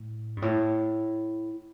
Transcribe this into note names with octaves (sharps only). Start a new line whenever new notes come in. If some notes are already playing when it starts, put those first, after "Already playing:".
Already playing: A2
G2
A2